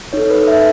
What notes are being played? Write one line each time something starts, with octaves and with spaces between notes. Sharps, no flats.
D#4 A4 C#5
B4
E5